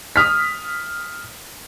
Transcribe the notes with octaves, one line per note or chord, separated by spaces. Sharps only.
D#6 F6 B6